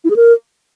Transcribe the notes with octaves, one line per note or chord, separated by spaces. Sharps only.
E4
G#4
A#4